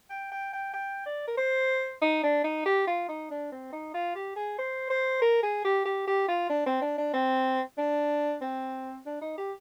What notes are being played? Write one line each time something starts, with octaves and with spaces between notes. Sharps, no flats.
G5
G5
G5
G5
D5
A#4
C5
D#4
D4
D#4
G4
F4
D#4
D4
C4
D#4
F4
G4
G#4
C5
C5
A#4
G#4
G4
G4
G4
F4
D4
C4
D4
D4
C4
D4
C4
D4
D#4
G4